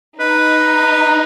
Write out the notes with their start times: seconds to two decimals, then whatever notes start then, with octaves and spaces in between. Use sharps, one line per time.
0.19 D#4 B4